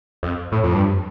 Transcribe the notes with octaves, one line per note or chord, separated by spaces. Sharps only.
F2
A2
F2
G2